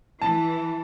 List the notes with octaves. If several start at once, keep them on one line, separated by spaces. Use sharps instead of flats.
E3 A5